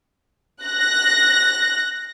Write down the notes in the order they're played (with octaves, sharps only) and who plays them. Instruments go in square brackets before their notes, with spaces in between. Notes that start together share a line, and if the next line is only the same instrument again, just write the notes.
[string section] F#6 A#6